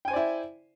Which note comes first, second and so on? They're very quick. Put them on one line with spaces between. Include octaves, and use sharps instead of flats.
G5 G#5 C5 D5 E4